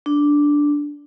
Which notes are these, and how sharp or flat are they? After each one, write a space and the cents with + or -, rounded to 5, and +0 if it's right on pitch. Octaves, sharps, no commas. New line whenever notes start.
D4 -5